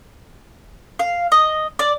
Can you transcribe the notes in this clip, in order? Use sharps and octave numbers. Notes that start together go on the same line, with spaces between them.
F5
D#5
D5